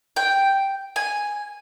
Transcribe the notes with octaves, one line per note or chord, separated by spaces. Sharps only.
G5
G#5